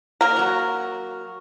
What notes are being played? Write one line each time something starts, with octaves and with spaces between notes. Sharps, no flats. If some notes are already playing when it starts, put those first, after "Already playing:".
A#3 A#4
F#3 F#4